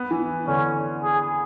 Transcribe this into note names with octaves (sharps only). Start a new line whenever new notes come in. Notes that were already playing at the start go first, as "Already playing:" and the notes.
Already playing: B3
E3
D3 C#4
G#4